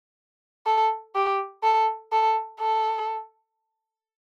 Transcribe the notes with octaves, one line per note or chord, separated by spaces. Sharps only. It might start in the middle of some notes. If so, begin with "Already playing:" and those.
A4
G4
A4
A4
A4